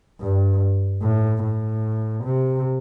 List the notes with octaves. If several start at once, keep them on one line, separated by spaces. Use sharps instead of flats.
G2
A2
A2
C3